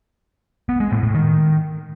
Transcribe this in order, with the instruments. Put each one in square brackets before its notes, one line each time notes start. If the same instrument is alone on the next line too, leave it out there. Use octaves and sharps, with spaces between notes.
[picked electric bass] B3
G#3
A2
A2
D#3